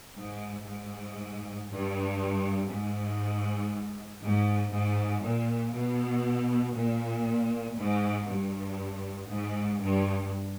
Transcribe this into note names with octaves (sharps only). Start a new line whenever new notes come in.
G#2
G#2
G2
G#2
G#2
G#2
A#2
B2
A#2
G#2
G2
G#2
G2